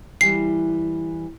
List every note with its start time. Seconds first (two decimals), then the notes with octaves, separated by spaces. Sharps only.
0.21 E3 G3 C7